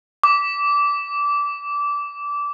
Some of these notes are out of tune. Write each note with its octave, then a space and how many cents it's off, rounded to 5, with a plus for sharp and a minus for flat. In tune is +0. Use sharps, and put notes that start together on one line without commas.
D6 -20